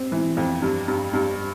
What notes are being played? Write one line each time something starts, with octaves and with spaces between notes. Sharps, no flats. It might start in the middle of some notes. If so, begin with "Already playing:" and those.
Already playing: C4
E3
F2
G2
G2
G2